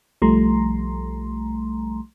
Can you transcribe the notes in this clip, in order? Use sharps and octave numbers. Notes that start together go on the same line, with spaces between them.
B1 F3 G3 A3 A#5 C6